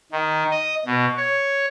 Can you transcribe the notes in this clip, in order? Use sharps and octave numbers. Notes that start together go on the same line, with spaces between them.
D#3
D#5
B2
C#5